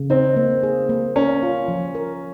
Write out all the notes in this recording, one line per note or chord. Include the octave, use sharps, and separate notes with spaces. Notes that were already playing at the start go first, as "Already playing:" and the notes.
Already playing: C#3
C4 D#4
A#3
G#4
A#3
C#4 A#4
F4
F3
A#4